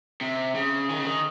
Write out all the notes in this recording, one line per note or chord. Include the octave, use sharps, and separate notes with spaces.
C3
C#3
D#3
C#3
D#3